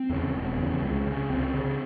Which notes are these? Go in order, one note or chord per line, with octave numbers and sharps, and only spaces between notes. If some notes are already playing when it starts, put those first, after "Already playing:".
Already playing: C4
E2 C#3
E1
E2 C#3
C#2
C#3
C#2 C4
C#3